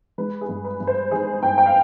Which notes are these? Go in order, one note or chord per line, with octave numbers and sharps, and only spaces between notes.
G#3 B4
G#4
G2
B4
G2
C5
D#3 G#4
G2 G5
G5
F5